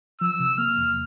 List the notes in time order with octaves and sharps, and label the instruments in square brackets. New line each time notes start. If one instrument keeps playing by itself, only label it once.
[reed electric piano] F3 [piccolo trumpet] E6
[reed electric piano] C3
[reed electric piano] A#3 [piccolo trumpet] F6
[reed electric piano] E2